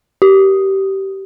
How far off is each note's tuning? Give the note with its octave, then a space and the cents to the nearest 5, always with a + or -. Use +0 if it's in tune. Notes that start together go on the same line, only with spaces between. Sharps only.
G4 -20